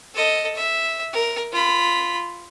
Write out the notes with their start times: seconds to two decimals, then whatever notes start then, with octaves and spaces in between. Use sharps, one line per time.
0.14 A4 D#5
0.55 E5
1.13 A#4
1.52 F4 B5